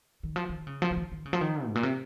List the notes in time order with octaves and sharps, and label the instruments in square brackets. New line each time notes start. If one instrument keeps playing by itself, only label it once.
[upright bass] D#3
F3
D#3
C#3
F3
C#3
D#3
D#3
C#3
F3
D#3
G#2
A#2
C3